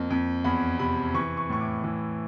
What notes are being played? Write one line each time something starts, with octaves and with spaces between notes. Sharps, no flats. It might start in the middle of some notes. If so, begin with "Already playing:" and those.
Already playing: F2 A#3
F2
E2 B5
C3 B5
E3 C#6
C#6
A2 C#6
D6
E3